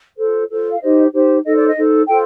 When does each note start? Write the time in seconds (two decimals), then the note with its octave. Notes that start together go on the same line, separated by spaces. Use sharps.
0.17 F4 A4 C5
0.49 F4 A4 C5
0.70 F5
0.80 D#4 G4 C5 D#5
1.13 D#4 G4 C5
1.44 D#4 A4 C5 D#5
1.56 D5
1.66 D#5
1.75 D#4 A4 C5
2.07 F4 A4 C5 G5